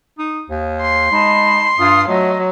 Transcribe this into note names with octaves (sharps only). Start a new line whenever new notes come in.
D#4
D#2
C6
G#3 D#4 A5 B5
G2 F4 D#6
F#3 A3 D#5